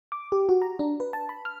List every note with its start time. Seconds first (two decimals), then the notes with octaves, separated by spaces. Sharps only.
0.12 D6
0.32 G4
0.49 F#4
0.62 A#5
0.79 D4
1.00 B4
1.13 A5
1.29 B5
1.45 F6